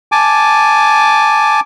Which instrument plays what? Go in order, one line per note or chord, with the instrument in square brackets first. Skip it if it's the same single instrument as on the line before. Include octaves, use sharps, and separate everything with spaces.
[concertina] G#5 A5 D6